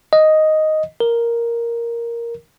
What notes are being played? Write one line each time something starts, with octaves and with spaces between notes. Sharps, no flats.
D#5
A#4